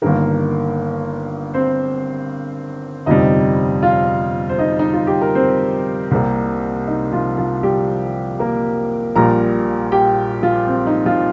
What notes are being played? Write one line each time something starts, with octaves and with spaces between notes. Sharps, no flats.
G1 G2 D#3 A#3 A#4
C4 C5
G1 F2 C3 G3 D#4 D#5
F4 F5
C5
D#4 D#5
D#4
F4
G4
A#4
C4 C5
C2 C3 G3 A#3
D#4
F3 F4
F3 F4
G3 G4
A#3 A#4
A#1 A#2 G3 A#4 A#5
G4 G5
F3 F4
C4
D#4
F3 F4